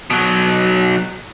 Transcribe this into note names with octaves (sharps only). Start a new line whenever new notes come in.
B2 F#3